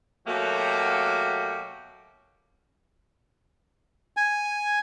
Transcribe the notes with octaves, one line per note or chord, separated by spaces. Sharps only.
B2 F#3 A3 A#3 F#4 G4
G#5